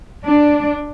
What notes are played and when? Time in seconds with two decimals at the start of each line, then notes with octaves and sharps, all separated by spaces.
0.24 D4